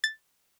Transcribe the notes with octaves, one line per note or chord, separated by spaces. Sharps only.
A6